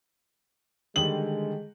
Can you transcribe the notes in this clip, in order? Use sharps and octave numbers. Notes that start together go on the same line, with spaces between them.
D3 D#3 G3 G#3 F#7